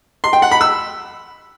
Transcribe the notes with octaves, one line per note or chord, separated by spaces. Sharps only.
C6
G5
F#5
B5
E6